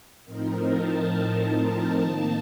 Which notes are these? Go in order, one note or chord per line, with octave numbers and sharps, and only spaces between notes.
A2 F3 C4 D#4 A#4
A5
A5
D#3 A#3 D#4